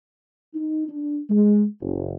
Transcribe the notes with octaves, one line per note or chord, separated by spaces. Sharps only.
D#4
D4
G#3
F#1